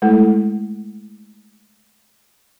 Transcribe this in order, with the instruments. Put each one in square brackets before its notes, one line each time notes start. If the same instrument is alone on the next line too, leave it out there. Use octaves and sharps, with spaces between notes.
[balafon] G#3 A3 E4 A4